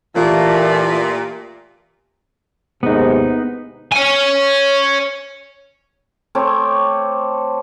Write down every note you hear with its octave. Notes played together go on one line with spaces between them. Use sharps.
A#2 E3 A3 F4 G4 D5
D#2 G#2 C3 B3 D#4
C#5 G#5
A3 C4 C#5 D6